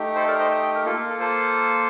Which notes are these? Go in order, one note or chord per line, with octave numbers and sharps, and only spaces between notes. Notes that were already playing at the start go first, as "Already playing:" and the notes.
Already playing: A3 D#4 G4
A4 C5
A#4 D5
C5 D#5
D#5 G5
A#4
A#3 F4 A4
A#4
A4
A4 C5